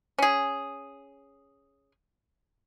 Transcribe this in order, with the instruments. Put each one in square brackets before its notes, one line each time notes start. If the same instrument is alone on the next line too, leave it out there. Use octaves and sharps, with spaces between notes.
[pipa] C#4 G#4